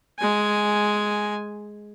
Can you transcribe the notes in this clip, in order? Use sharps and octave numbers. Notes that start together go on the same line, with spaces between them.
G#3 G#5